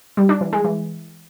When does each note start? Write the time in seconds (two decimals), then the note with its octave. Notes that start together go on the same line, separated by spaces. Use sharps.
0.17 G3
0.29 D4
0.41 E3
0.53 G#3
0.64 E3